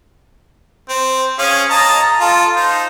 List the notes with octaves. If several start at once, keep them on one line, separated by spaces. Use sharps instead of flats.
C4
C#4 G#4 F5
D#5 A5 A#5
F4 A4
D#4 C5